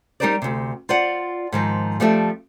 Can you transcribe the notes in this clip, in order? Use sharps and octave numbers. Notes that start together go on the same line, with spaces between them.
G3 D#4 G4 A#4 C5 D5
D2 C3
F4 C5 D5 F#5
G#2 D#3 F3
F3 G3 A3 C4 G4 E5